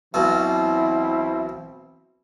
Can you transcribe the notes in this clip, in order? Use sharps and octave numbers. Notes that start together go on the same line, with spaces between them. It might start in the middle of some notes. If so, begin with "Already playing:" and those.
B1 B2 E3 C4 E4